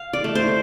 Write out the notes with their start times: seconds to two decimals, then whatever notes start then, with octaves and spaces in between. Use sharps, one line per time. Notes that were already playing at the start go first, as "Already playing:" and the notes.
Already playing: F5
0.13 D5
0.24 A3
0.35 C5